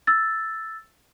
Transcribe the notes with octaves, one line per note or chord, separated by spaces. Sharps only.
E6 A6